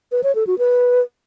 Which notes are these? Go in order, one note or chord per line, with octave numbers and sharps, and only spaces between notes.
B4
C#5
A4
F#4
B4